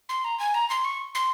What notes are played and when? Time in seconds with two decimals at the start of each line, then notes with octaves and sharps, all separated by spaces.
0.09 C6
0.24 A#5
0.39 G#5
0.54 A#5
0.70 C6
0.85 C#6
1.15 C6